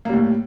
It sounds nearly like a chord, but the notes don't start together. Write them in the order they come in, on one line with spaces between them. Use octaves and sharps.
A#3 G3 A2